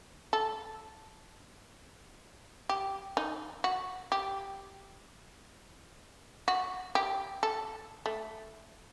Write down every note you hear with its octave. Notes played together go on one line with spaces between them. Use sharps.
A4
G4
D#4
F#4
G4
F#4
G4
A4
A3